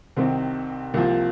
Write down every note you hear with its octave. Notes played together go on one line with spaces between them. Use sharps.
C2 C3 D#3 C4
C2 C3 F3 A#3